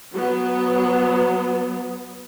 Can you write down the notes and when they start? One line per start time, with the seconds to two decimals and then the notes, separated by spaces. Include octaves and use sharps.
0.13 F#3 B3